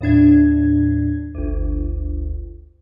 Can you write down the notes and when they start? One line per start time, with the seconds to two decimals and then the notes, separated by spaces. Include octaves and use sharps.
0.01 D#2 A2 D4 G#6
1.35 G1 D2